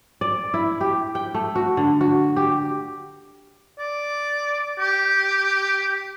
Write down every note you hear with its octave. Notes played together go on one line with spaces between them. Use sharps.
D5
E4
G4
G5
A3
F#4
D3
F#4
G4
D5
G4